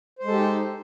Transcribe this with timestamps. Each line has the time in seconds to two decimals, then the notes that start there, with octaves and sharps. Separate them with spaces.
0.19 C5
0.23 G#3
0.27 A4
0.32 G4
0.36 D#4